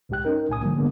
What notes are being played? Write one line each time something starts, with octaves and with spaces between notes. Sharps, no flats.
C2 G#2 G#3 G4 G5 F#6
C#4 D#4 A#4 G5
C2 A2 G#5 D#6
D3 D#3 F3 G3 A#3
G#2 D3 G#3 A#3 B3 D4